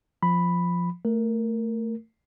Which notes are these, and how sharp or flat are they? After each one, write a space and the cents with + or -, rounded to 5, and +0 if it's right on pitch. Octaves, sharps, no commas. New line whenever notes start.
F3 +0 B5 +0
A3 +20 A#4 +0